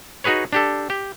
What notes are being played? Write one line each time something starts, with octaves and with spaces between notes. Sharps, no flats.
D#4 F#4 G#4 B4 C#5
D4 G4 A4
G4